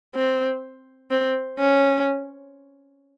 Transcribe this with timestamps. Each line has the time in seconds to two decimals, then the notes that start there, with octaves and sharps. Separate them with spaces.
0.15 C4
1.11 C4
1.59 C#4